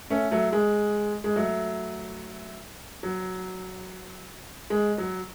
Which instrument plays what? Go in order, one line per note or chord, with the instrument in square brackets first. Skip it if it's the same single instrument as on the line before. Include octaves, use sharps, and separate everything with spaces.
[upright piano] A3 C#4
F#3 A3
G#3
G#3
F#3 A3
F#3
G#3
F#3